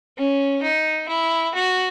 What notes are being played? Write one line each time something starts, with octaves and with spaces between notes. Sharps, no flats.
C#4
D#4
E4
F#4